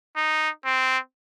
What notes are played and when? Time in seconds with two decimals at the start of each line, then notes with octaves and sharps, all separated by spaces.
0.16 D#4
0.65 C4